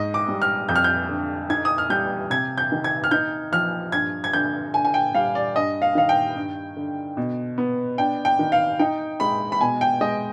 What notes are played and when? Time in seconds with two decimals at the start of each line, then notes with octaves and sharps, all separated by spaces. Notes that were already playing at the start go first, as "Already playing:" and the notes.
Already playing: G#2 D#5
0.14 D6
0.28 G3
0.42 F6
0.69 F2 G6
0.76 F6
0.84 G6
1.09 D3
1.50 D#4 G#6
1.65 D#6
1.78 F6
1.90 G3 G6
2.30 C3 G#6
2.58 G6
2.72 D#3
2.84 G#6
3.04 F6
3.11 D#4 G6
3.52 F3 F6
3.92 G2 G#6
4.24 G#6
4.33 D3 G6
4.74 D3 G#5
4.85 G#5
4.94 G5
5.15 G3 F5
5.35 D5
5.55 G2 D#5
5.82 F5
5.95 D#3 F5
6.09 G5
6.36 G2
6.77 D3
7.17 B2
7.58 B3
7.98 D4 G5
8.25 G5
8.39 D#3
8.52 F5
8.79 D#4 G5
9.20 G#3 B5
9.52 B5
9.61 B2 G#5
9.81 G5
10.01 G#3 D#5